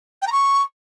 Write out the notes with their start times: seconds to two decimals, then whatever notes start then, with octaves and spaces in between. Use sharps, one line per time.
0.22 G5
0.27 A#5
0.32 C#6